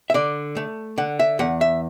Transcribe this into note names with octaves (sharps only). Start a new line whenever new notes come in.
E5
D3 D5
A3
D3 F#5
E5
E2 F#5
E5